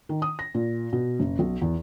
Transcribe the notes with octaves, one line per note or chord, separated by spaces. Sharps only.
D#3
D#6
A#6
A#2
B2
F#1
B1
E2